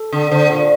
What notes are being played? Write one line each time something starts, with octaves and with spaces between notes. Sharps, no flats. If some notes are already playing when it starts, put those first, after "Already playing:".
Already playing: A4
D3
D3 C5
A#2